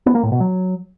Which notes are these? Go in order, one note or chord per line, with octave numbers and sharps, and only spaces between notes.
B3
A#3
A2
B2
F#3